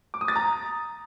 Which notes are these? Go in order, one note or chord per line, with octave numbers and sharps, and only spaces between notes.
D6
D#6
A6
A#5